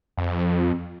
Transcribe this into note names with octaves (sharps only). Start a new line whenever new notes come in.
F2